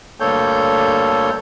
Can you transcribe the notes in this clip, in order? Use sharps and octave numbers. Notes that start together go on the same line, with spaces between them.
D2 G2 A#3 A4 C#5 G6